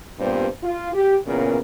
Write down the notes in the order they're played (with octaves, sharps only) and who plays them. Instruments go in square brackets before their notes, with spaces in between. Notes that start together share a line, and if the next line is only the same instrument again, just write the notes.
[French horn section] G2 A#2 G3 B3 C4 C5
F4
G4
E2 A#2 C#3 B3 C#4 A#4